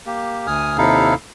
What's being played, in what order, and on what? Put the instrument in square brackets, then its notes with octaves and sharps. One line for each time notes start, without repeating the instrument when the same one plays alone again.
[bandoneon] A#3 G4
D2 G#5 D#6 F6
D#2 C3 D#4 E4 A4 F5